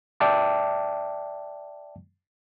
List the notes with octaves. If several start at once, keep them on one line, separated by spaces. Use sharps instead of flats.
D5 E5 G5 A5 D6